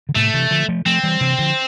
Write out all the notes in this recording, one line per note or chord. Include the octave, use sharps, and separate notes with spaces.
D3
A2 C3 A3
C3 E3
D3 F3
F3 A3
F3 A3 C4
E3 G3
C3 E3
D3 F3